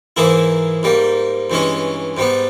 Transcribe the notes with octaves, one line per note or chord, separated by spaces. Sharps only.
G#2 E3 A#3 E4 G#4
G#2 G3 A#3
G2 E3 G#3 C#4
G#2 G3 B3